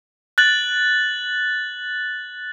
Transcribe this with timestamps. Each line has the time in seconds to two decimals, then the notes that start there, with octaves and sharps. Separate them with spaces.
0.38 F#6 A6 F#7